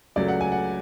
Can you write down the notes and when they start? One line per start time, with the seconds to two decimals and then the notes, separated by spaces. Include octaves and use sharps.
0.16 C#2 C#3 F#3 A3 D5
0.28 F#5
0.41 G#5
0.52 F#5